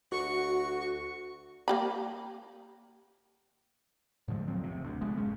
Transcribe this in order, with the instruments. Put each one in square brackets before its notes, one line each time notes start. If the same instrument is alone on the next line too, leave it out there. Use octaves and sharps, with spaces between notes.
[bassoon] D2 [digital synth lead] F#4 [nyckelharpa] C#6
[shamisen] A#3 G4 B5
[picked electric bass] A2 D3 F3 G#3
D#1 F3 F#3 C4
F1 C#2 C3
D2
C2 G#3 B3
F1 G#2 G#3 C#4